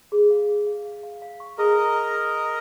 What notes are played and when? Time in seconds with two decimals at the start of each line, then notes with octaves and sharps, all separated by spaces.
0.12 G#4
0.30 F5
0.49 G#4
0.67 F5
0.85 F5
1.03 F5
1.22 F5
1.40 C#6
1.58 G#4 A#4 D#5